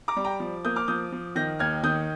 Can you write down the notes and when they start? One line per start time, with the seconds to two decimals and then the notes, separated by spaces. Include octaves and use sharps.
0.08 A#5 D6
0.16 G3
0.24 G5 A#5
0.40 F3
0.64 A#3 D#6 G6
0.76 D6 F6
0.88 F3 D#6 G6
1.12 F3
1.35 D#3 G6 A#6
1.59 D#2 F6 G#6
1.83 D#3 D#6 G6